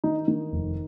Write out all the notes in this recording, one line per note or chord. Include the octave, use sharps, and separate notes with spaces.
D#3 D#4
D#3
F1